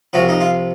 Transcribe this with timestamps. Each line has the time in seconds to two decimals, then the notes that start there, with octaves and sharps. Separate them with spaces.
0.13 C2 C3 F3 F#4
0.29 D#4
0.40 F4